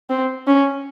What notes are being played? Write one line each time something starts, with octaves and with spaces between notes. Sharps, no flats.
C4
C#4